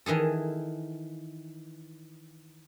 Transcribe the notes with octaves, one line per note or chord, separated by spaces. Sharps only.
D#3 E3 G#4 A4